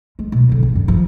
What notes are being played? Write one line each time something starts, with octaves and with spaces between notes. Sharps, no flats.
G#3
B2 D#4
F2 D3
C#2 E3
G2
D#3 F3